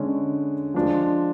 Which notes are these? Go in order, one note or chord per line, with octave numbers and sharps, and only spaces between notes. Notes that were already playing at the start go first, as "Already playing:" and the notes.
Already playing: D3 G#3 C#4
F3 G#3 D4 F4